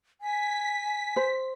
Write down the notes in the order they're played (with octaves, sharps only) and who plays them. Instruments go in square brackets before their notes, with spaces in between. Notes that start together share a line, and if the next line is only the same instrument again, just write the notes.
[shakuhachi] G#5 [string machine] B6
[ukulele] C5